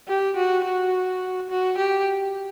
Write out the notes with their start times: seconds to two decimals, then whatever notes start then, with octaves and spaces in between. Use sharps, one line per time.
0.08 G4
0.36 F#4
0.65 F#4
1.50 F#4
1.78 G4